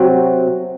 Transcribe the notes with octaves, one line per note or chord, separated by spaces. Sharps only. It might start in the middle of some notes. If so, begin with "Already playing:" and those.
Already playing: C3 F#3 C4 F#4